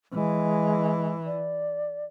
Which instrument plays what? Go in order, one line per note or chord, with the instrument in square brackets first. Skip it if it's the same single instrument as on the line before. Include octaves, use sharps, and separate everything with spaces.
[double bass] E3 [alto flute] G#3
[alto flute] D5